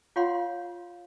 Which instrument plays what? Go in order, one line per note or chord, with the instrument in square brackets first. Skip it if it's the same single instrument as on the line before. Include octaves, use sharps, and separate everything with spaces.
[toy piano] F4 C#5 F5 F#5 B5 C6